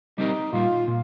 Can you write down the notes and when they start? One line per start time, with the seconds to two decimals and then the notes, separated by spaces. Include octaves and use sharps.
0.18 G3 C4 D#4 G4 A#4
0.53 A#2 G3 A#3 F4
0.88 A#2